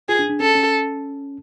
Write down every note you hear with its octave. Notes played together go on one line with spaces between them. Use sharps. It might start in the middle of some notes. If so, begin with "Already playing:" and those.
F4 G#4
D4
D4
C#4 A4
C#4